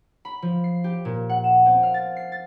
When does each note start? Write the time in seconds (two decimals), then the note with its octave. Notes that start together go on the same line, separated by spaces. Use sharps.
0.25 B5
0.42 F3
0.64 C7
0.84 G4
1.05 A#2
1.29 F#5
1.44 E7
1.66 C4
1.83 F5
1.94 A6
2.17 C7
2.32 A6